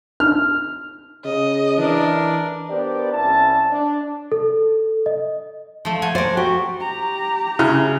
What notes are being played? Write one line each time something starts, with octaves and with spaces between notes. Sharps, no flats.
F6
C#3 D#5
E3 D4 A#4
B3 D4 G4 A#4 C5 D5
C2 C#4 E4 A5
D4
A4
D#5
F3 A3
A3 F#5 G#5
A#4 C5 D5
F#4 G4
G4 A#5
C#3 E4